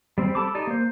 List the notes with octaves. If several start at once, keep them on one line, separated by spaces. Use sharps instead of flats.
G3 C4
A4 A5 B5 D6
D#4 G4 D5
A#3 C5